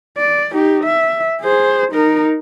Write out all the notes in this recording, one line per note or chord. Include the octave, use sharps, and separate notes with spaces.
D5
D#4 G4
E5
G#4 C5
D#4 A#4